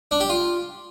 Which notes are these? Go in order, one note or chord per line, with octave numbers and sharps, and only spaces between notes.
D4
G4
F4